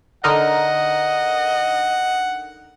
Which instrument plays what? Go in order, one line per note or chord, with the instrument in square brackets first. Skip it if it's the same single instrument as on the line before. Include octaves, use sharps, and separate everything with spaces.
[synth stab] D3 D#4 A#4 [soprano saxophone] D#5 [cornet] F#5